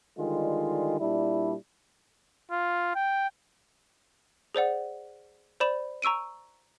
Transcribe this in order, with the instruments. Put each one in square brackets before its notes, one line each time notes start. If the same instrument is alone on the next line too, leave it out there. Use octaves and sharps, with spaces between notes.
[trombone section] D3 D#3 G3 G#3 F4
A#2 G3 D4 E4
[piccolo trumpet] F4
G5
[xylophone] G#4 C5 D5 F#5
C5 D5 B5 E7
A#5 C#6 E6 D7 D#7